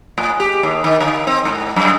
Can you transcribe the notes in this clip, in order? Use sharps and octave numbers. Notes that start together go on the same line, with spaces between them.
A2
G4
D#2
D#3
D3
C4
G#2
F#2